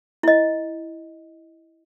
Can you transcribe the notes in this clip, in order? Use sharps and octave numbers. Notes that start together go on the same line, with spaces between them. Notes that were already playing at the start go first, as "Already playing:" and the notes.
E4 D#5